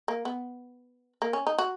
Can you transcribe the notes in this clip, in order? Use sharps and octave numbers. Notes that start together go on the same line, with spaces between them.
A#3
B3
A#3
C#4
D#4
F#4